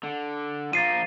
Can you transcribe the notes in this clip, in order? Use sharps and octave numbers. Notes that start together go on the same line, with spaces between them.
D3
F3 A#3 A6 C7 D#7